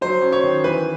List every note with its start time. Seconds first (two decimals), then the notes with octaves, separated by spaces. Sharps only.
0.01 F#3 C5
0.22 C#4
0.32 C#5
0.43 D#3
0.64 E3 B4